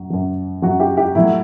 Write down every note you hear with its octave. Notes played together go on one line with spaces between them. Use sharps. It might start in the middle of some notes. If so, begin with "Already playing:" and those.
Already playing: F#2 F#3
F#2 F#3
F#2 F#3 F#4
G4
G4
A2 F#3 E4